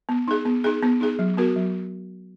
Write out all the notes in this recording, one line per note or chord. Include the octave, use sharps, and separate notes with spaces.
B3
D#4 G#4
B3
D#4 G#4
B3
D#4 G#4
F#3
B3 F#4 A#4
F#3